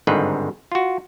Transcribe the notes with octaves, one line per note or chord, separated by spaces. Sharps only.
G1 G#2 D3 D#3 C4 B4
F4 F#4